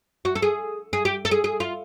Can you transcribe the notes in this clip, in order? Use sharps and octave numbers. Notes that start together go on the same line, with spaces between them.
F#4
A4
G#4
G#4
G4
A4
G#4
G#4
F4